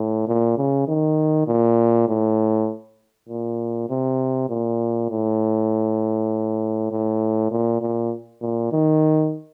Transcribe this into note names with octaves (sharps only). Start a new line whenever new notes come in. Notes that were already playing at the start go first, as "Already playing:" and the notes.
Already playing: A2
A#2
C#3
D#3
A#2
A2
A#2
C3
A#2
A2
A2
A#2
A#2
A#2
D#3